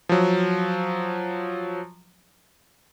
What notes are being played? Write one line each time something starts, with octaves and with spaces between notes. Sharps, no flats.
F3 F#3